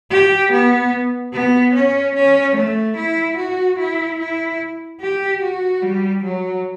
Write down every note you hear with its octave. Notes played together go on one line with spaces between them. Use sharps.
G4
B3
B3
C#4
C#4
A3
E4
F#4
E4
E4
G4
F#4
G3
F#3